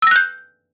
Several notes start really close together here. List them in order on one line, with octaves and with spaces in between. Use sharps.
E6 A#6 F#6 G6